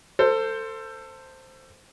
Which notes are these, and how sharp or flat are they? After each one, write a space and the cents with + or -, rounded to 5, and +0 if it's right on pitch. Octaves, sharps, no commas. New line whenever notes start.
A4 +25 C5 +0